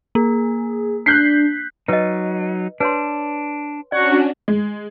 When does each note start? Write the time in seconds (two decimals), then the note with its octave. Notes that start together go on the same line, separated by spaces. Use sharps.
0.15 A#3 G#4
1.06 D4 F#6 G6 B6 C7
1.88 F#3 D#4 B4 D#5
2.80 D4 B4 C#5 C6
3.92 C#4 D4 F#4 D5 F#5 A#5 C#6
4.48 G#3